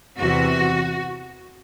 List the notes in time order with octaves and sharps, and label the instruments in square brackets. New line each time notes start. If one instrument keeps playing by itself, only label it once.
[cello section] E2 C3 E3 F#4